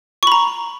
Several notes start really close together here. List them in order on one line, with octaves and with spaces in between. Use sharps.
C#6 B5 A#5